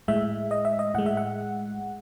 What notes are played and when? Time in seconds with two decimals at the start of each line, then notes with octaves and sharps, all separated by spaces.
0.08 A2 G#3 E5
0.51 D#5
0.65 E5
0.79 D#5
0.94 A2 G#3 F#5
1.06 E5
1.17 F#5